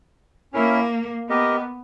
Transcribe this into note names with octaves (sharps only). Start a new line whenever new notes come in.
A#3 C#4 E4 A#4 E5
B3 G4 A#4 D#5